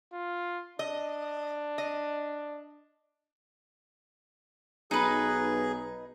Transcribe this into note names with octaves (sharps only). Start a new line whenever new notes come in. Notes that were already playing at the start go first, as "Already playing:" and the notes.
F4
D4 D#5
D#5
B1 D#4 G#4 B4